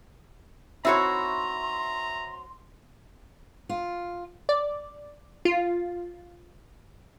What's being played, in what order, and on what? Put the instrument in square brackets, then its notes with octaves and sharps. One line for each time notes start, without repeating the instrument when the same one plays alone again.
[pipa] D#3 E4 [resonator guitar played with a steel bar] C4 F#4 C#5 [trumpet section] E5 A#5 [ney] C6
[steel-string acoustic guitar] F4
[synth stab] D5
F4